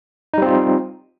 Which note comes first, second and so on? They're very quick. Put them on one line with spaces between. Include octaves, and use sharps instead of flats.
D#4 G3 C4 F4